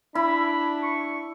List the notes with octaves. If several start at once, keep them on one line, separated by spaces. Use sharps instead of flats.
D4 E4 B5
C#6